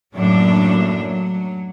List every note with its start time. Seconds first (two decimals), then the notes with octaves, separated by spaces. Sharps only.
0.15 F#2 A2 G3 A3 A#3 D4
0.98 F#3